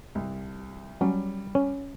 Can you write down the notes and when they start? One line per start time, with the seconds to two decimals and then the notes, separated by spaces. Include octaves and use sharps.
0.15 C2
1.01 F#3 G3 C#4
1.55 C#4